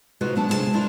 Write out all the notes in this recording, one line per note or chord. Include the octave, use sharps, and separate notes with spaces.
C3 G#3 D#4 F4 F#4 B4
B2 F#3 B3 D4 F#5 A5
D2 C3 G#3 F4 G4 A5
D4 E4 F4 A#4 B4 D5